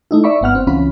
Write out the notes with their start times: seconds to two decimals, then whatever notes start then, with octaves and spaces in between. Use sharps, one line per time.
0.11 A3 D#4 E4
0.24 D5 E5 B5 C#6
0.41 G1 B3 F#5 F6
0.55 C4
0.67 C#2 E3 C#4 F4 B5